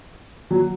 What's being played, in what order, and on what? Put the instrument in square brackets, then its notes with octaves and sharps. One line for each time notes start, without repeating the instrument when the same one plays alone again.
[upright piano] F#3